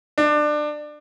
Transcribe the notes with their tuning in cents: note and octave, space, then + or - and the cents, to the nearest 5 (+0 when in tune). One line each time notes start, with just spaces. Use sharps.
D4 +25